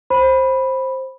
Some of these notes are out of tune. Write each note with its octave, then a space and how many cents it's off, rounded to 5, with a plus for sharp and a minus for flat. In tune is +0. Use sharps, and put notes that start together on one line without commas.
C5 +10 B5 -5